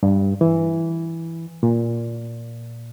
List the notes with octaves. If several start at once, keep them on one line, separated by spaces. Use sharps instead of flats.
G2
E3
A#2